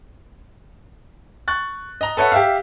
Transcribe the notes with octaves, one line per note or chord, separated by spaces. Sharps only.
C#6 F#6 A6
D#5 A#5
A4 B4 C#5 E5 F#5
G4 E5 F5